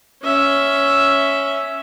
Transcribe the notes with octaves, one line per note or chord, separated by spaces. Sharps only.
C#4 E5